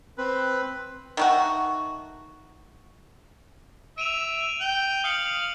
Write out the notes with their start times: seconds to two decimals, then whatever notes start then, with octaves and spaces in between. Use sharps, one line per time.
0.18 C4 B4
1.17 D#3 A3 F#4
3.98 E5 D7 D#7 F7
4.61 G5
5.04 F5 D#6 C#7 F#7